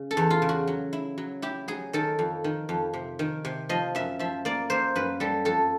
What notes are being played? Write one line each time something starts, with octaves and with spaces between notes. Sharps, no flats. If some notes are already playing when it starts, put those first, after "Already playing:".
Already playing: C#3
A4
E2
F4
C#3
F#4
F#3
E4
F#3
E4 G4
F#3 G#4
D#3 A4
F2
D#3
F2
C3
D#3
C3
F3 D#5
F#2 E5
F3 E5
A#3 D5
A#3 C5
F#2 B4
G3 A4
F2 A4